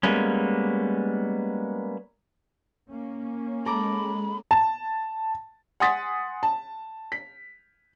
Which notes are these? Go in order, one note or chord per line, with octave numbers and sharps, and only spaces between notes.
G3 G#3 A#3 B3 C#4
A#3 C#4
G#3 A4 A#5 B5 D6
A5
F#5 G#5 C6 D#6 A6 B6
A5
B6